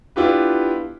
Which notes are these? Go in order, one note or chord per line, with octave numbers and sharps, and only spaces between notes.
B3 D4 E4 F4 G4 B4